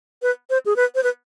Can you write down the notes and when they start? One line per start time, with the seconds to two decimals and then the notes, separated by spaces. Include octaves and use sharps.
0.22 B4
0.50 C5
0.66 G#4
0.76 B4
0.95 C5
1.03 B4